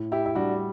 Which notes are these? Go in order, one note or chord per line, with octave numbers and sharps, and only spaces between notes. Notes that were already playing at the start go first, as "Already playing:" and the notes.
Already playing: A2
E4 G4
E4
G3 D4 F#4